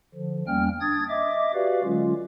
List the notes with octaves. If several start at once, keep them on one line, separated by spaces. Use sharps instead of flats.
D3 F3
E2 G3 A#3 C#4 G5 F6
D4 D#6 G#6 A6
D#5 E5 D6
F#4 G4 B4 D5 F5
D3 F#3 G#3 C#4 F4